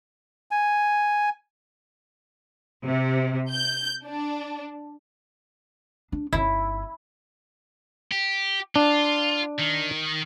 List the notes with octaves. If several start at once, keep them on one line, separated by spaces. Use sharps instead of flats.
G#5
C3
G6
D4
D4
G1 D#4 E4
G4
D4 F4
D#3